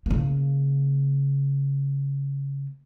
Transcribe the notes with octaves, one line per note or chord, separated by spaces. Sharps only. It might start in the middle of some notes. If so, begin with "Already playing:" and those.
C#3 A#3